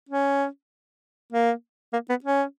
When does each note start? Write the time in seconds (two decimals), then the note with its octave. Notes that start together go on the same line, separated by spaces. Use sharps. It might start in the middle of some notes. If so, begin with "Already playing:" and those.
0.09 C#4
1.32 A#3
1.93 A#3
2.09 B3
2.24 C#4